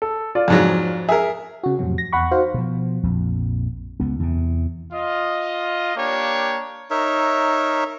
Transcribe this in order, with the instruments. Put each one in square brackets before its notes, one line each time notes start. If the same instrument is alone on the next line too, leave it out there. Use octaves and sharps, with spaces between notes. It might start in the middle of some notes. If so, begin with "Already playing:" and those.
[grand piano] A4
F4 D5
[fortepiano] F2 G#2 F#3
[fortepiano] G#4 A#4 [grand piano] E5
[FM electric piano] C#3 F#4
F2 A2 C3 F#3
A#6
E2 F#5 B5 C#6
D#4 F#4 C5 F5
[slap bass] B2 F3
A#1 F2
C#2 B3
E2 C3
[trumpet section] F4 D#5
A#3 D4 G4 C#5
[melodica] D#4 A#4 C#5 E5